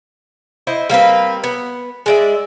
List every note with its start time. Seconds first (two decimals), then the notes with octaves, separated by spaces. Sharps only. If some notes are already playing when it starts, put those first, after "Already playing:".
0.67 E4 C5 D#5
0.89 G3 A#3 C4 B4
1.44 B3
2.06 G#3 D5 E5